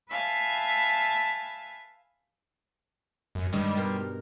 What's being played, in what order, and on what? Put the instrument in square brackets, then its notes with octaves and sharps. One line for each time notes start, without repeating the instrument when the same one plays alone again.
[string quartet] B4 E5 F5 G#5 A5
[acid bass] F#2
[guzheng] G2 D#3 [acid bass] G3 [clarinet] G#3
[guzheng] B2 C6 [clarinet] A#4